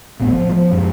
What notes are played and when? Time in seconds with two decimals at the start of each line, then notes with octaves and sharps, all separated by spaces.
0.19 D1 G1 A2 B3
0.33 F3
0.52 F3
0.72 F#2 G#3